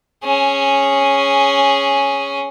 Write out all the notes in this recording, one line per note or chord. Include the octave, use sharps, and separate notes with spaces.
C#4 G#4